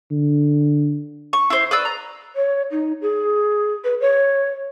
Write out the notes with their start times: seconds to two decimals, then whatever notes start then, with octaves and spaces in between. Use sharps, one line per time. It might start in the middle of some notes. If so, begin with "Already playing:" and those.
0.11 D3
1.33 C#6
1.50 E4 C5
1.71 B4 D5 E6
1.85 A#5
2.36 C#5
2.71 D#4
3.02 G#4
3.84 B4
4.01 C#5